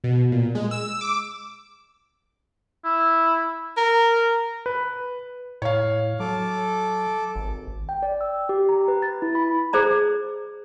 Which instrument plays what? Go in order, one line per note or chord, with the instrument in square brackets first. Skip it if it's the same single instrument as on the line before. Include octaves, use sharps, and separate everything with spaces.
[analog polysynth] B2
A#2
G#3
E6
D6
[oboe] E4
[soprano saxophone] A#4
[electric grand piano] B4
[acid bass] A2 [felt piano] C#5 F5
[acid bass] F#3 [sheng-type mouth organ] A4 D6
[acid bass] G#1
[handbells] G5
D5
E6
G4
A#5
B4
A6
E4
B5
[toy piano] G#4 C5 D5 A#5